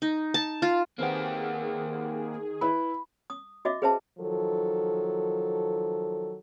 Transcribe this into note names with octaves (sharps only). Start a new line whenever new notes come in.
D#4
A5
F4
D#3 A#3 C4 G4 G#4 B4 F#5
E4 B4 B5
D#6
F#4 D#5 E5 D6
G#4 B4 C5 E5 A5
D#3 F3 F#3 A4